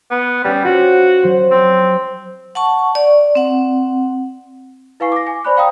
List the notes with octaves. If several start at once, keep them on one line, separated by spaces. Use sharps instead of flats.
B3
G3 C#4 B4
C4 F4 F#4
F#3 C5
C4 E6
F#5 A5 C#6
D5
C4 F#5
E4 B4 F5 G#5 C#6 C7
D6 A#6
G#5
C5 D5 B5 F#6
D5 F5 G5 A#5 D#6